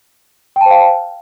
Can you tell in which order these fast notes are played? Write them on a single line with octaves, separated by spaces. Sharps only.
G5 A5 C5 F5